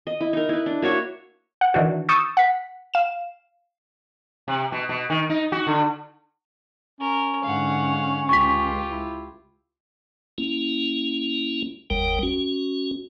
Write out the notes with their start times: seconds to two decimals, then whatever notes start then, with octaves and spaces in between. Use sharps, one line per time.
0.07 D#5
0.21 E4
0.33 D#4 A#4
0.49 E4 B4
0.66 D4
0.82 A#3 F#4 C#5 E5
1.61 F#5
1.74 D#3 E3 D4 F#4
2.09 C#6 D#6 E6 G6 A6
2.37 F#5 B6
2.94 F5 E7
4.48 C3
4.72 B2
4.89 B2
5.10 D#3
5.30 D#4
5.52 F#4
5.67 D3
7.00 C#4 A#4
7.44 G#2 D3 F5 F#5
8.29 C#2 F4 G4 C#6 B6
8.91 E4
10.38 A#3 C#4 E4
11.90 F#1 D#2 G3 A#4 G5
12.23 C#4 F#4